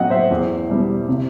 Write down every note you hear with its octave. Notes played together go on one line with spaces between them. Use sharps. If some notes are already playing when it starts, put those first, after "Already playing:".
Already playing: A2 F#3 B3 D#5 F#5 G5
C5 E5
E2
B2 G3
C3